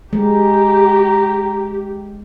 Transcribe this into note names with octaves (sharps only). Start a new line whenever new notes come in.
G#3 G4 A#5